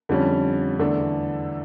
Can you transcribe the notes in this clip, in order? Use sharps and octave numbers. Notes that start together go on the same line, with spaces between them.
F2 D3 G3 C#4
E2 D3 A3 D4 A4